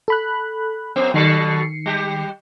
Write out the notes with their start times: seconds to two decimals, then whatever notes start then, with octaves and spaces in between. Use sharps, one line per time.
0.08 A4 B5 F#6
0.96 F#2 B3
1.14 B2 D#3 F#3 A4 C7 C#7
1.86 G3 G4